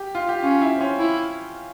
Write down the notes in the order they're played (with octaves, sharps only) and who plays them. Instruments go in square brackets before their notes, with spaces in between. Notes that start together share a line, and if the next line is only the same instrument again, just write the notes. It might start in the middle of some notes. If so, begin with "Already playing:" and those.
Already playing: [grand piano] G4
F4
G4
[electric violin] C#4 [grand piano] F4
[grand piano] E4
C4
C#4
[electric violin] E4